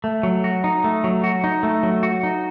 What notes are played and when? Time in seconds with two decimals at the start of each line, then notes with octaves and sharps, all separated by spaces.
0.04 A3
0.23 F#3
0.44 F#4
0.64 D#4
0.84 A3
1.04 F#3
1.24 F#4
1.44 D#4
1.63 A3
1.83 F#3
2.03 F#4
2.23 D#4